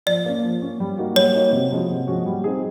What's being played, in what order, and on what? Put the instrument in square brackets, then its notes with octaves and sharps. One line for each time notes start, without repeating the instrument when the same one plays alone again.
[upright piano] F3 [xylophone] D5
[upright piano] A#3 C#4
F3
A#3 C#4
G3
A#3 D#4 F#4
[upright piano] G3 [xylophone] C#5
[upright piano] A#3 D#4 F#4
C3
F3 G#3 C#4 F#4
C3
F3 G#3 C#4 F#4
G3
C4 D#4 G#4